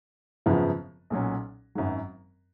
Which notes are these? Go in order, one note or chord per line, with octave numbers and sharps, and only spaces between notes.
G#1 F#2 C#3 F3 B3
B1 A#2 F#3 C#4
G#1 F#2 D#3 F#3